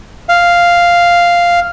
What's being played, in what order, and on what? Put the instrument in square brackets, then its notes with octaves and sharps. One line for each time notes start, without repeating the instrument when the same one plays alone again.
[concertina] F5